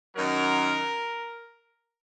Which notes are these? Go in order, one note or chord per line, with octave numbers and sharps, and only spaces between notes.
F#2 D#3 F#3 A#4